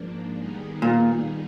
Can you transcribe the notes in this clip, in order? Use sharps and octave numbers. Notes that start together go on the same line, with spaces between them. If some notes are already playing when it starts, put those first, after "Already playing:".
Already playing: G#2 F3 A#3 D4
D#3 G3 B3 D#4 G#4
A#2